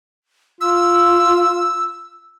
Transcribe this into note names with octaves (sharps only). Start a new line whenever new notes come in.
F4 E6